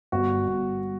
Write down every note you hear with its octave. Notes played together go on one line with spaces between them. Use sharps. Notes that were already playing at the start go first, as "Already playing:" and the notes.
G1 F#4
G1